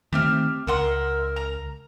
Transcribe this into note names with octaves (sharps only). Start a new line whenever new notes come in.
D#3 A3 C4 G4 E5 F6
C#2 A#4 E5 F#5 C6
A#5